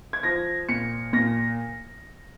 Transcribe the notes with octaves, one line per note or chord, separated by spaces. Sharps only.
G#6
F3 A#6
A#2 C#7
A#2 A#6